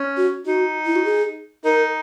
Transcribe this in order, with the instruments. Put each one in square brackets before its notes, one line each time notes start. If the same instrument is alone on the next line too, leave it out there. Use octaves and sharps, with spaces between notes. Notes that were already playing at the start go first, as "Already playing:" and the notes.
Already playing: [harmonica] C#4
[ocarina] F#4
[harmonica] D#4 [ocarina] F#4
[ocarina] E4
F#4
G#4
[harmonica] D#4 [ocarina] A#4